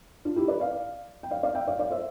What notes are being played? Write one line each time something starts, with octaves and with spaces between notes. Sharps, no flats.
D4 F4
E4 G4
B4 D5
D5 F5
G5
D5 F5
D5 F5
E5 G5
D5 F5
D5 F5
C5 E5